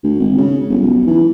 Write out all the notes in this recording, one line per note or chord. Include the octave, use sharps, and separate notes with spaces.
D2
G#1
C#3
G1
B1
E3